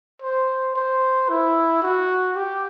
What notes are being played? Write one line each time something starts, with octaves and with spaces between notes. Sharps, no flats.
C5
C5
E4
F#4
G4